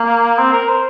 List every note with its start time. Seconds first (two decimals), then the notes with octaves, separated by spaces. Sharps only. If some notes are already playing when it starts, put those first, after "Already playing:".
Already playing: A#3
0.38 C4
0.53 A#4
0.69 C5